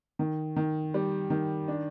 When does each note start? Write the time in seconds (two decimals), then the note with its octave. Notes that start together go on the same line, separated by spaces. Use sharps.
0.19 D#3
0.56 D#3
0.94 G3
1.30 D#3
1.68 D4